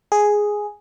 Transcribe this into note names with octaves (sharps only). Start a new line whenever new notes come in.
G#4